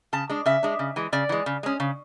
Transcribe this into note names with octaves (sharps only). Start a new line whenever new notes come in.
C#3 A5
G#3 D4
C#3 E5
G#3 D4
C#3
E3 G#3
C#3 D5
E3 G#3
C#3
G#3 C#4
C#3